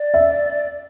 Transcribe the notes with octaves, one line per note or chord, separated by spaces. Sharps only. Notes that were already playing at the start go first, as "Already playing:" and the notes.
Already playing: D5
E5